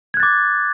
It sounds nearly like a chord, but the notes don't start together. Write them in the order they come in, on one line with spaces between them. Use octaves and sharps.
G#6 F#6 A6 D6